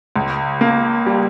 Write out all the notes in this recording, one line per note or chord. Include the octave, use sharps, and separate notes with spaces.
C#2
A#3
G3